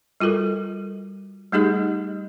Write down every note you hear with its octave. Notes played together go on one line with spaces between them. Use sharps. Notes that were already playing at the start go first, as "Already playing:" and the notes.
G3 F4 F#4 A4 A#4
G3 A3 D#4 G4 G#4 D#5